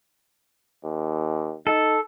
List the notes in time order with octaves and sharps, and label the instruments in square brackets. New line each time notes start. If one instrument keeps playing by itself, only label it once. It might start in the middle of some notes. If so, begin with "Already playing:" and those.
[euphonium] D#2
[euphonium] D#4 [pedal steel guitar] A4